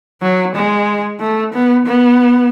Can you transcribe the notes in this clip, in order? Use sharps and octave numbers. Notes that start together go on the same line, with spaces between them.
F#3
G#3
A3
B3
B3